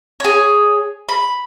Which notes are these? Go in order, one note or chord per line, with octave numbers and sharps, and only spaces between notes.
G#4 C#5
B5